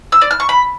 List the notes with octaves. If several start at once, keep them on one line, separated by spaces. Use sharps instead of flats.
E6
D5
F6
C#6
B5